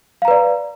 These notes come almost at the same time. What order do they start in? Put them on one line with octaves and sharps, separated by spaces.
F5 A#5 B4 D5